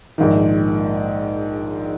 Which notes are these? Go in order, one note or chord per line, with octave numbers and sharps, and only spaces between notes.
A#1 G#2 D#3